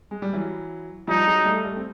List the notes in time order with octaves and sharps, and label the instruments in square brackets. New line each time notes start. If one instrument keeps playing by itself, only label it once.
[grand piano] G#3
G3
E3 F#3
[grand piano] F3 G3 [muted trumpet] D#4
[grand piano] F#3 G#3
G3 A3
G3 A3
C4